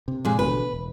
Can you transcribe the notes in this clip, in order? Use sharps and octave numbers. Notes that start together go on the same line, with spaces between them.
C3
A#2 G#3
A1 B2 D3 B4
E1